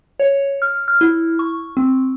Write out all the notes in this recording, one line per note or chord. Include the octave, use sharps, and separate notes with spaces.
C#5
F6
F6
E4
C#6
C4